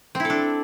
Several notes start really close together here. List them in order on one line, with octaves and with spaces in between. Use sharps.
C4 E4 A4 D4